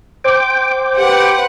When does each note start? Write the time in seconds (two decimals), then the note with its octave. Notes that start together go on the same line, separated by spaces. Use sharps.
0.24 C5 G5 D6
0.98 G4 B4 F#5